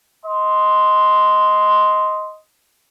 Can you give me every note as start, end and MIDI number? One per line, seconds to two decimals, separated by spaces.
0.25 2.37 75
0.25 2.37 84